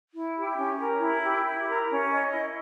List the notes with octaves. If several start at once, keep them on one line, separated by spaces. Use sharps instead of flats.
E4
G4
C#4
A#4
E4
G4
E4
A#4
C#4
D#5
E4